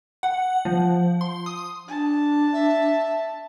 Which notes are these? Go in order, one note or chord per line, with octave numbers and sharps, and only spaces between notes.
F#5
F3
C6
D#6
D4 A5
E5